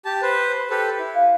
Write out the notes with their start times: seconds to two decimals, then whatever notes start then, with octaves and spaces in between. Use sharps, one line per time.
0.05 G4 A5
0.22 B4 C5
0.70 G4 A4 B4
0.99 E4
1.15 F5